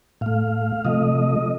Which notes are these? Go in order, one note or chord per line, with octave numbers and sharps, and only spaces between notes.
A2 A3 F5
C3 F3 A3 D#5